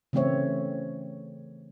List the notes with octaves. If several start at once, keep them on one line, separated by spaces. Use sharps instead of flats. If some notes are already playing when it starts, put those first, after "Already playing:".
C#3 E3 A3 C4 C#5 E5